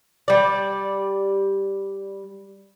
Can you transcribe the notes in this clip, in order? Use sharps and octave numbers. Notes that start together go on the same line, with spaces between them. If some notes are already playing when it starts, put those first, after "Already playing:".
G3 D5